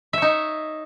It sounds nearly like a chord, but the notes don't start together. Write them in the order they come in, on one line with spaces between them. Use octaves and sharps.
E5 C#5 D#4